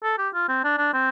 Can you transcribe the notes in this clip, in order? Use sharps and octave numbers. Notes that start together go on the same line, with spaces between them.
A4
G4
F4
C4
D4
D4
C4